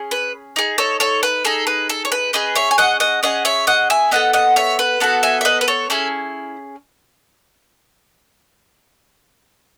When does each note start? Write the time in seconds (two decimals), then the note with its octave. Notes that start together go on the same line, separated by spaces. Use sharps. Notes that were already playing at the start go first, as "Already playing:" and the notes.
Already playing: C#4 G#4
0.11 B4
0.56 D#4 G#4
0.78 A4 C#5
1.00 A4 C#5
1.23 B4
1.45 D#4 G#4 A4
1.67 B4
1.89 A4
2.05 C#5
2.12 B4
2.33 C#4 G#4 B4 D#5
2.56 C#5 E5
2.71 G#5
2.78 D#5 F#5
3.00 D#5 F#5
3.23 C#4 G#4 D#5 F#5
3.45 C#5 E5
3.67 D#5 F#5
3.90 E5 G#5
4.11 B3 F#4 A4 D#5 F#5
4.33 D#5 F#5
4.56 C#5 E5
4.79 B4
5.00 B3 F#4 A4 F#5 A5
5.23 E5 G#5
5.41 E5
5.45 B4 D#5
5.61 B4
5.68 A4 C#5
5.90 C#4 E4 G#4 A4